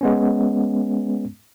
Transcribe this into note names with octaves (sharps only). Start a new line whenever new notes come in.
G#3 B3 C#4